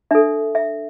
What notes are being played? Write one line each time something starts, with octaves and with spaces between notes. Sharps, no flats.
D4 A4 E5
E5